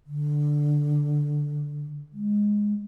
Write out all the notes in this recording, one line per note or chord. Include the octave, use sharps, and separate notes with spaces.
D3
G#3